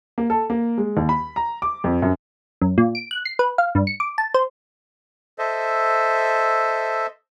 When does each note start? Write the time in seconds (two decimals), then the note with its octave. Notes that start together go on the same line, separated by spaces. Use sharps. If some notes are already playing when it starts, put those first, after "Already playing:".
0.18 A#3
0.30 A4
0.50 A#3
0.78 G#3
0.97 D#2
1.09 B5
1.36 A#5
1.62 D6
1.84 F2
2.02 F#2
2.62 F#2
2.78 A#2
2.95 D7
3.11 F#6
3.25 C7
3.39 B4
3.58 F5
3.75 G2
3.87 C#7
4.00 D6
4.18 A5
4.34 C5
5.39 A4 C5 D#5 E5